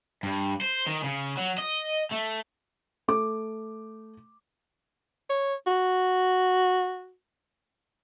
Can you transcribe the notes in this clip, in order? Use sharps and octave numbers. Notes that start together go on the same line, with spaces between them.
G2
C5
D#3
C#3
F#3
D#5
A3
A3 D6
C#5
F#4